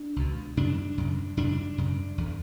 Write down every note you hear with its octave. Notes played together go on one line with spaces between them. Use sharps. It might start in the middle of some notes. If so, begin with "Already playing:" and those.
Already playing: D4
C#2 B2
F#2 C#3 D4
F#2 C#3
F#2 C#3 D4
F#2 C#3
E2 D3